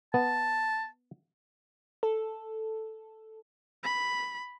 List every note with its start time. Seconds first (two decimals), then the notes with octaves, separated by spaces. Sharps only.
0.14 B3 A5
2.03 A4
3.84 B5